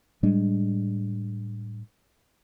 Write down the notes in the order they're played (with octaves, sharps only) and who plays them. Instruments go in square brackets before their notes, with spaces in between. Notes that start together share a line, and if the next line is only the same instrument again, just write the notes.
[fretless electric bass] A2 G3 G#3 D4